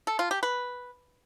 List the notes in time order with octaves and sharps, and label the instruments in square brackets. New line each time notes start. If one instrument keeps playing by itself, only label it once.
[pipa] A4
F4
G4
B4